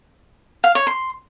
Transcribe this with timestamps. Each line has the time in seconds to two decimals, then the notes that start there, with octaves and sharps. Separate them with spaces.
0.64 F5
0.75 C#5
0.87 C6